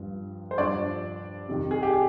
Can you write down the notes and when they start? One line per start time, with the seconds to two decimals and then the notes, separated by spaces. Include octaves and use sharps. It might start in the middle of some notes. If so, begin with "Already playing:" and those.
Already playing: G2 F3
0.51 C5
0.58 G2 F3 D4 D5
1.48 F2 C3 D#3
1.71 G#4
1.83 G4
1.93 G#4